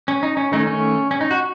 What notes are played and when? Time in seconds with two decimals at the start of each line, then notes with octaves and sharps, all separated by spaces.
0.08 C#4
0.23 D#4
0.37 C#4
0.52 D#3 A3 C#4 D#4
0.67 C#4
1.11 C#4
1.21 D#4
1.31 F#4